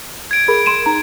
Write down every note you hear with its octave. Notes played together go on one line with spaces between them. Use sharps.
G#6 D7
G#4 A#4 B5
C6 D#7 E7
D#4 A#5